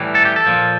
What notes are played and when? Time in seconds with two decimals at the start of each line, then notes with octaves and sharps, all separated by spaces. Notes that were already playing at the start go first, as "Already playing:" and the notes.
Already playing: A2 E3 G3
0.15 A4
0.25 G4
0.36 A4
0.46 A#2 F3